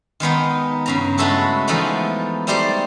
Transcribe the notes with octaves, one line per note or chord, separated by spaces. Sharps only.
D#3 G#3 B3 D#4
G2 C#3 A#5
G#3 A3 E4 F#4 A4 B4
E3 F3 G#3 A3 B3 D#4
G3 A3 D#4 G4 C5 D5